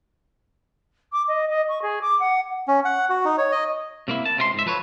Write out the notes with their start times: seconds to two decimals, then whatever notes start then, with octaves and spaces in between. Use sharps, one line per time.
1.12 D6
1.28 D#5
1.49 D#5
1.68 C#6
1.82 G#4
2.01 D6
2.20 F#5
2.68 C#4
2.85 F#5
3.10 F#4
3.25 D#4
3.38 C#5
3.52 D#5
4.08 C3 A#3 E4
4.26 A5
4.37 C#2 C3 A#4 C6
4.54 G#2 E5
4.66 F3 A4 B4 C#5